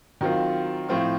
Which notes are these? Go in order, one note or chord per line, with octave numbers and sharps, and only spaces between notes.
D#3 F#3 C4 F4
A2 F3 C4 F4